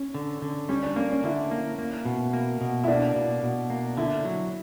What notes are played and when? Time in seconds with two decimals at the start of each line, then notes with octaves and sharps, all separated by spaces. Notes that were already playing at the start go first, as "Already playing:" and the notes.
Already playing: C#4
0.14 D3
0.42 D3
0.69 G3 C#4
0.82 D4
0.96 A#3 C#4
1.11 C#4
1.24 D3 E4
1.51 A#3
1.78 A#3
2.05 B2
2.33 A#3
2.61 B2
2.84 E4
2.87 A#3 D4
3.15 B2
3.43 B2
3.70 A#3
3.97 D3 E4
4.25 F#3